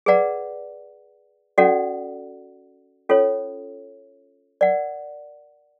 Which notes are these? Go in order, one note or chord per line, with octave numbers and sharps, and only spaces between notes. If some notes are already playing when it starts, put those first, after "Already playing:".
G#4 B4 D5 F#5 A#5
C#4 F#4 A4 D5 F#5
C#4 F4 A4 C#5
A#4 D5 F#5